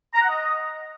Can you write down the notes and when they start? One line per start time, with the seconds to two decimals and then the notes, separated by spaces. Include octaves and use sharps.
0.14 A#5
0.22 F#5
0.29 D#5